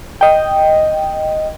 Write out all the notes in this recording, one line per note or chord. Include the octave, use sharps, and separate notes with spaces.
D#5 G5